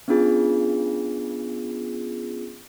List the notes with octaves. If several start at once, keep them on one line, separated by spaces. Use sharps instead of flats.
B3 C#4 D4 F4 G#4